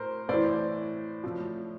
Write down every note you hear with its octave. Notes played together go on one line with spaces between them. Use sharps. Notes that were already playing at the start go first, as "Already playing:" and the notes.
Already playing: A2 A#4 C5
A2 E3 C5 D5
A2 F3